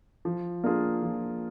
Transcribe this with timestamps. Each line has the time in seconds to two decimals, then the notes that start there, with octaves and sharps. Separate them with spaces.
0.25 F3
0.64 A#3 D4 F4 G#4
1.03 F3